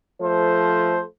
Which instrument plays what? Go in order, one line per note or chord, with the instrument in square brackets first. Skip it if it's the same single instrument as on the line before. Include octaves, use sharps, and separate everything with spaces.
[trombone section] F3 A3 A4 C5